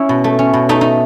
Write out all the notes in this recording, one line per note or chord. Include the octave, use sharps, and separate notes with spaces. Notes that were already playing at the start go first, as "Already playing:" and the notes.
Already playing: C#4 E4
B2
A3
C#4
B2
A3 D#4
D#4